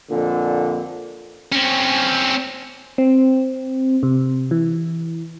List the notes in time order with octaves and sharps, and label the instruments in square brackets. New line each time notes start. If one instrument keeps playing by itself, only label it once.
[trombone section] F2 A#2 D3
[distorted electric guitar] C4 C#4
[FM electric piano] C4
C3
E3